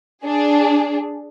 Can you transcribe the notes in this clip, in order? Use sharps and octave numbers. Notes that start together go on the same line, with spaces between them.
D4 G#4